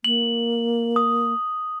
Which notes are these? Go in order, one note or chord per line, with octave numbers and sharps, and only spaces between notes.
A#3 F#7
D#6